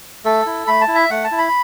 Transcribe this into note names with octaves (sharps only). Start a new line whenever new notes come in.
A3 A4
E4
A3 B5
A5
E4
E5
A3 F#5
A5
E4
B5